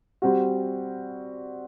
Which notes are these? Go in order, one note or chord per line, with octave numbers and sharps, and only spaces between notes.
G3 C4 F#4